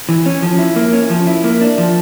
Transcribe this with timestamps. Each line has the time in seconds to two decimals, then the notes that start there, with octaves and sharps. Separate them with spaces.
0.09 E3
0.26 C#4
0.42 F3
0.59 E4
0.76 A#3
0.93 C#4
1.10 F3
1.27 E4
1.44 A#3
1.61 D4
1.78 F3